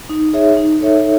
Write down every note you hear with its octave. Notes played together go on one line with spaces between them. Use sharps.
D#4
G#4 C#5 E5
D#4
A4 C#5 E5